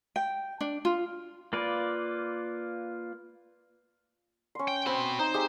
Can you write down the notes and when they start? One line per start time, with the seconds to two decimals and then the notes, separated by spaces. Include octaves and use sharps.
0.16 G5
0.61 D4
0.85 F4
1.53 A#3 F4 B4 D5
4.55 C#4 C6
4.68 G5
4.86 C4 F#4 B5
5.19 D#4 C5
5.34 G4 G#4 E5